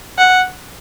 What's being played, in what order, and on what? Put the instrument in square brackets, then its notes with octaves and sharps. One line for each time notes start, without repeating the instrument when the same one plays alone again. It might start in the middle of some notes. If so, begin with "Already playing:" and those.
[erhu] F#5